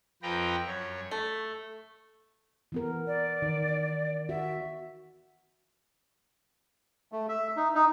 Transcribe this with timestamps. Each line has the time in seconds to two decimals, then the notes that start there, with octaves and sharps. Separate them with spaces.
0.23 F2 F3 B4 G5 A#5
0.66 F#2 C#5
1.11 A3
2.72 E3 B3 A#4
3.07 D5
3.42 D#3
4.29 F#4 E5
7.12 A3
7.29 E5
7.57 D#4
7.75 D#4